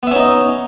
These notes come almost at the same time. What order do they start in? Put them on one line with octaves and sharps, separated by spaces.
B3 E5 C#4 D#4 D#5